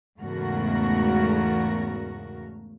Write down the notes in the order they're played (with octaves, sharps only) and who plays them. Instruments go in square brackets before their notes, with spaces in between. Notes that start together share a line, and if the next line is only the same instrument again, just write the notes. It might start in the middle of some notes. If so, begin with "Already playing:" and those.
[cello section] E2 G#2 C#3 A3 F#4 A#4